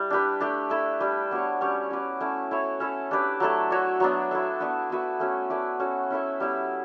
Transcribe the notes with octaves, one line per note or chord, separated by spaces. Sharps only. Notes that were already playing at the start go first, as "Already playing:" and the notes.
Already playing: G3 E4
D4 G4 B4
A3 D4 G4
A3 E4 A4
G3 D4 G4 B4
B3 D4 F#4 C#5
G3 C#4 G4 C#5
C#4 F#4 B4 D5
A3 C#4 E4
E4 A4 C#5
C#4 E4 A4
D4 G4 B4 D5
F#3 A3 E4 A4
D4 F#4 C#5 E5
F#3 B3 D4
E4 A4 E5
B3 D4 F#4 B4
B3 F#4 B4 E5
A3 C#4 F#4
A3 E4 B4 D5
C#4 F#4 A4
C#4 E4 A4 E5
G3 B3 E4